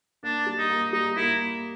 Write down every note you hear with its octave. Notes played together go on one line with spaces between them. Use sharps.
A#3 D4
G3
D#4
A#3
G3 D#4
A#3 E4